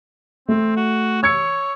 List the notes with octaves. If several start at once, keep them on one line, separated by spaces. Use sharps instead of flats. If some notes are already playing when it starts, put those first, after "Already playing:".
A3 C4
F#4
C#5 E6 G#6 C#7